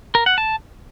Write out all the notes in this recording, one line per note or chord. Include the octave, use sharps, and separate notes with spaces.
A#4
F#5
A5